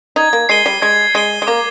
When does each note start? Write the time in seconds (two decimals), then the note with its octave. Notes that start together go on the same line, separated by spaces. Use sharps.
0.16 D#4 G#6
0.33 A#3
0.49 G#3 C7 D#7 G7
0.66 G3
0.82 G#3 G#6
1.15 G#3 C7 D#7 G7
1.42 G#3
1.47 A#3 D6